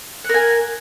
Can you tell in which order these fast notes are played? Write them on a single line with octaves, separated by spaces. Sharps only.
F#5 A#4 G#5